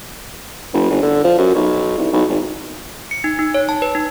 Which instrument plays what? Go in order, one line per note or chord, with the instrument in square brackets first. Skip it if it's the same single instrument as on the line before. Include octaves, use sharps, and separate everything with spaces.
[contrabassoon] F#1
G1
D3
F3
F#2
B1
C2
B1
G#1
[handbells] C#7
D#4
D#4
C#5
A5
B4
D#4